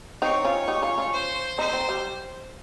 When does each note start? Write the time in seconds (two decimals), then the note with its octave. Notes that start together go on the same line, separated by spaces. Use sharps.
0.22 C4 D#4 C#5
0.45 C#4 F4
0.68 D#4 G4
0.82 C#4 F4
0.98 C#4 F4
1.13 C5
1.58 C4 D#4 C5
1.73 C4
1.89 G3